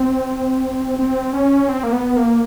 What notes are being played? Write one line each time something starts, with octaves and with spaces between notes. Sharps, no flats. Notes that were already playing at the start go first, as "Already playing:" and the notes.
Already playing: C4
C4
C#4
C4
A#3
B3
A#3